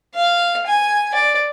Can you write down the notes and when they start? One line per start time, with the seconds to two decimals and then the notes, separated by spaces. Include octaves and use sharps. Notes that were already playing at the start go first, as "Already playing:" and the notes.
0.15 F5
0.67 G#5
1.14 D5